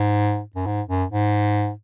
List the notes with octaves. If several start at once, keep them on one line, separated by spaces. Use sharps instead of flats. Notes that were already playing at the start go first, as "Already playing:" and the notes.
Already playing: G#2
F#2
G#2
F#2
G#2